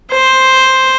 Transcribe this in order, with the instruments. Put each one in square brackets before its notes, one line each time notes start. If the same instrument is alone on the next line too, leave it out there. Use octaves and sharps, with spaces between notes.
[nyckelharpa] C5